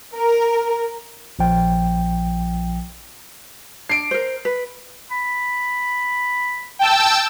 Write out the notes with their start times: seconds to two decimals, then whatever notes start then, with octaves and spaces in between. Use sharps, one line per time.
0.17 A#4
1.39 A#1 F3 G5
3.89 D4 C7 D7
4.11 A#4 C5
4.45 B4
5.12 B5
6.79 G5 A5 E6